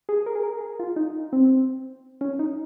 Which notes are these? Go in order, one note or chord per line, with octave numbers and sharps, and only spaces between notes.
G#4
A#4
G#4
A#4
G#4
F4
D#4
C4
C#4
D#4